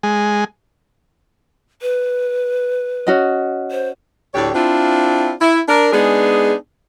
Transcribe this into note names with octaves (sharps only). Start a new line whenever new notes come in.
G#3
B4
C#4 F#4 D#5
C5
D2 A2 D4 G4 C#5 D5
C4 D4 E4 F4
E4
D4 A#4
G#3 B3 D4 D#4 G#4